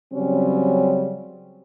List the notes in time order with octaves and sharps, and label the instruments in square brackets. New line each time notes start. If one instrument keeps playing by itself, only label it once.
[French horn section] C#3 F#3 G3 C4 C#4